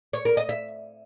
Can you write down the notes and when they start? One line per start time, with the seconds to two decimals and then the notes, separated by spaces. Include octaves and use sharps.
0.13 C#5
0.25 A#4
0.37 D#5
0.49 E5